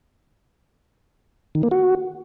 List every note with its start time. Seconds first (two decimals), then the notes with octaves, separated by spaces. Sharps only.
1.55 D#3
1.63 A#3
1.71 F#4